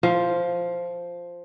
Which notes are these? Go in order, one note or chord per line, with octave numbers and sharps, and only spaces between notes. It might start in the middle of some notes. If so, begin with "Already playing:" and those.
F3